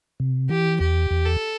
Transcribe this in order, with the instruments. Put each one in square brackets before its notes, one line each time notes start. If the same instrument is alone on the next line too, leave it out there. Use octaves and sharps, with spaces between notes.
[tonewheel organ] C3
[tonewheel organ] E3 [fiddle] G4
[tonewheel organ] E2 [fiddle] G4
[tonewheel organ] E2
[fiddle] A4